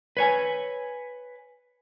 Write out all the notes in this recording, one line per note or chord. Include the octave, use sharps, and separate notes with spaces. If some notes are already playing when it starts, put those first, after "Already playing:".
B4 C#5 G#5